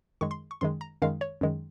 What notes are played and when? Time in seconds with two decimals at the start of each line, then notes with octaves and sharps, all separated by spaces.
0.21 F#2 D#3 G#3 C#6
0.31 C6
0.51 C#6
0.61 F#2 D#3 G#3 C6
0.81 A#5
1.02 F#2 D#3 G#3 F5
1.21 C#5
1.41 F#2 D#3 G#3